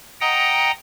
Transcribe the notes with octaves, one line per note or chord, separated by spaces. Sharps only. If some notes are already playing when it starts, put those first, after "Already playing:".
D#5 F#5 G5 A#5 D#6